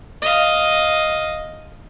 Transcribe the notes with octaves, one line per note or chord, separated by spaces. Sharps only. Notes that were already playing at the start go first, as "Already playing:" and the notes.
D#5 F5